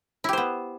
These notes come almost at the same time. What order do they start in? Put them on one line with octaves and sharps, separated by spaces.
E4 G4 C5 B3